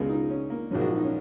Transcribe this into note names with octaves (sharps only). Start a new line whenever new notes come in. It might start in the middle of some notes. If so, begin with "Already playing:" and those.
Already playing: C#2 B2 G#3 F4
D#4
C#4
A#3
A#1 G#2 F#3 C#4
F#4
F4
D#4
C#4